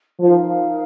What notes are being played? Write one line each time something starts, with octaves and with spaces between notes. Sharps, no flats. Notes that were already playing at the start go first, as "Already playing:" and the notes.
F3 D#4 A#4 F5